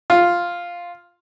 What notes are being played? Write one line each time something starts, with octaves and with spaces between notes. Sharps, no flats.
F4